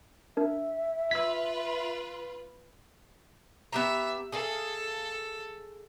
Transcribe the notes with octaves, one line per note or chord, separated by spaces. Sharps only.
D4 A#4 E5
F4 B4 E6 G#6 B6
B3 G4 E5 A#5
G#4 A4 F5 G#5